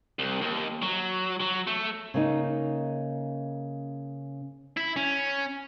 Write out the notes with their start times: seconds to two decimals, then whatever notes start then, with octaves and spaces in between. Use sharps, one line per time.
0.19 C2
0.41 D#2
0.82 F#3
1.41 F#3
1.67 A3
2.14 C#3 A#3 D#4
4.77 E4
4.96 C#4